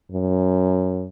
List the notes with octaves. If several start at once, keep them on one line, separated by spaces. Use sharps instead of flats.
F#2